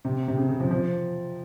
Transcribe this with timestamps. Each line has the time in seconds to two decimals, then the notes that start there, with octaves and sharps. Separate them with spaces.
0.05 C3
0.28 C3
0.37 C#3
0.49 C#3
0.60 F3
0.71 F3